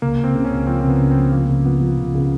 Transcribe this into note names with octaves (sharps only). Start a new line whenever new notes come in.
C#2 A#3
C#2
C4
C#3
C#4
C#2
F3 C4
C#2 C4
B3
C#3
F3 C4
F3 A#3
C#3
F3 B3
F3
C#2
C#3